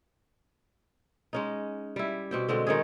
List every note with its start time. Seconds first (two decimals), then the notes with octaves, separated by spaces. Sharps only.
1.33 G#3 C#4 D#4
1.96 G3 E4
2.31 B2 C4 G4
2.48 B2 D3 G#3 C4
2.67 D#3 G#3 C#4 G#4